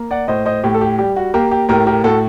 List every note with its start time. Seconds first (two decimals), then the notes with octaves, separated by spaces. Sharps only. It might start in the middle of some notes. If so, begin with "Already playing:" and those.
Already playing: A#3
0.11 D5 F#5
0.28 A2 C5 D#5
0.46 C5 D#5
0.64 A2 G4
0.74 A4
0.81 G4
0.98 G3 G4
1.16 F#4
1.34 A#3 G4
1.51 G4
1.69 A2 G4 A#4
1.87 G4 A#4
2.04 A2 F#4 A4